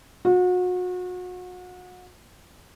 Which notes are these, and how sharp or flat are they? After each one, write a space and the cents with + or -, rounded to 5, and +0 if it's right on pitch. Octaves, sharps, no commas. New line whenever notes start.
F#4 -35